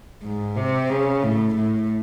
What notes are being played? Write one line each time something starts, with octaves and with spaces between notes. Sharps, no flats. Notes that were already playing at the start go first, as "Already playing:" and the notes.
G#2
C3
C#3
A2
A2